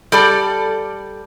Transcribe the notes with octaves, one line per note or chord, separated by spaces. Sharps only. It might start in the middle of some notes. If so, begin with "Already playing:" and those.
G3 A4 D5